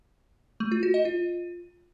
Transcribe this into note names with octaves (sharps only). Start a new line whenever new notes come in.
A3
F4
F#4
D#5
F4